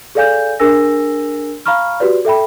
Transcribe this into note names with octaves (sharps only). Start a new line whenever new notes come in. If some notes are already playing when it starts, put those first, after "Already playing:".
G#4 A4 D5 F5 G#5 G6
D4 G#4 A#4 G#5 E6 A#6
F5 A#5 B5 C#6 F6
F#4 G4 B4 D5
A4 E5 G5 B5